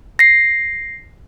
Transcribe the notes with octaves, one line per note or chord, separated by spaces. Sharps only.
A#6 C7